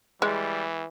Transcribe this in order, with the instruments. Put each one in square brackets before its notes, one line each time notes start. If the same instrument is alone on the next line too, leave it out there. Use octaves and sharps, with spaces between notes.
[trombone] E3 [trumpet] G3 [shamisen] G#3